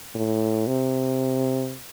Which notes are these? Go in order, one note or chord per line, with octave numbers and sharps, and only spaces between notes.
A2
C3